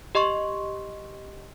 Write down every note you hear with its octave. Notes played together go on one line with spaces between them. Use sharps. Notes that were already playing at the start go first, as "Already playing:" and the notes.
G4 D#5 C6 C#6